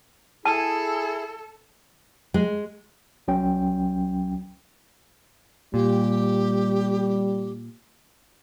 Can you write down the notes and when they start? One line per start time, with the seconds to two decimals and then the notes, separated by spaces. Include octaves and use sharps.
0.45 E4 G#4 A4 A5
2.34 G#3
3.28 C2 F#3 C#4 G5
5.74 A#2 G3 G4